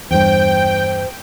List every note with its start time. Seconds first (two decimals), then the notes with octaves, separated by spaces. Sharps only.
0.11 E2 G2 C5 G5